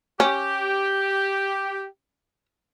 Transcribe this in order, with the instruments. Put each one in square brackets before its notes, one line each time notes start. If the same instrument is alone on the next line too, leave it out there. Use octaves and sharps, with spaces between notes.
[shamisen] C#4 [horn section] G4